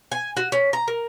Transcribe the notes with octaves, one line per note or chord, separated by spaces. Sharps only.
G#5
F#4
C#4
A#5
A#4